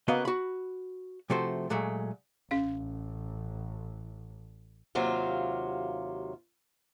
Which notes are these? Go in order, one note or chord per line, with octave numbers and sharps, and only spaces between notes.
C#3 A#3 B3 F#4 D#5 F5
F#4 B5
C3 F3 A3 F#4 C5
A#2 F#3 G#3 A3
A1 C#4 F5
D#2 C3 F#3 F4 F5